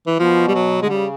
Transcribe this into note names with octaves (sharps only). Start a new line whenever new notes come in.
E3
B2 F3
G3
F#3
D3 G#3
C#3 G3